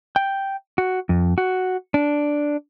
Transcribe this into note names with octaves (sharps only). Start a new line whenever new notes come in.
G5
F#4
F2
F#4
D4